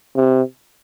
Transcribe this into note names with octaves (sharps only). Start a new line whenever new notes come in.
C3